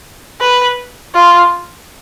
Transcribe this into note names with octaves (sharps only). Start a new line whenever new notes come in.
B4
F4